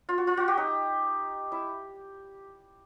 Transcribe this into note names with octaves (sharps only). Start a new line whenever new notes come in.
F4
F#4
F4
F#4
G4
D#4
E4